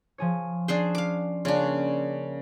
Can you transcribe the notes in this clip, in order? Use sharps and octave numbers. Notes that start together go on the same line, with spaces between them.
F3 G#4 C#5
C#4 D4 G#4 C5
F5 D6
C#3 A#3 C#4 D4 F4